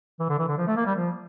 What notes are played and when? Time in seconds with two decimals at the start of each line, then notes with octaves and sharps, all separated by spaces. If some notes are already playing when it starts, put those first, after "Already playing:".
0.20 E3
0.29 D3
0.39 E3
0.48 D3
0.58 F3
0.67 A3
0.76 A#3
0.86 G3
0.95 F3